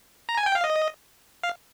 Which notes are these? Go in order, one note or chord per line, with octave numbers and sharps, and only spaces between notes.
A#5
G#5
G5
F5
D#5
F5